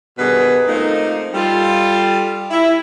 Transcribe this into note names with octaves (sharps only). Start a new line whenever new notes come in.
G2 B2 D#3 G3 G#4 B4
F3 A3 A#3 C4 D#4
G3 F4 A4
E4